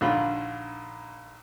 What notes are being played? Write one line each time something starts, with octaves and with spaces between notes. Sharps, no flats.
A#1 D#2 D3 F4 B5